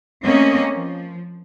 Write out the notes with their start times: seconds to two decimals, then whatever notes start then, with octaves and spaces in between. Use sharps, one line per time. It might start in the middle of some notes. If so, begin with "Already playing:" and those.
0.25 A3 A#3 C4 C#4 D#5
0.74 F3